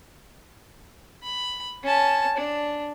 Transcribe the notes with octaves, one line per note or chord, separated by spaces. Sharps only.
B5
C#4 A5
D4